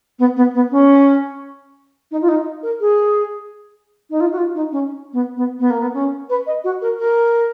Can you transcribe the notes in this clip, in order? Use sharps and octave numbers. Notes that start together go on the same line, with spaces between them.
B3
B3
B3
C#4
D#4
F4
D#4
A#4
G#4
D#4
F4
F#4
F4
D#4
C#4
B3
B3
B3
A#3
B3
C#4
B4
D#5
F#4
A#4
A#4